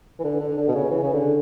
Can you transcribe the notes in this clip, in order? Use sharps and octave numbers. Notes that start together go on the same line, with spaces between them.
E3
D3
D3
D3
B2
C#3
E3
C#3
D3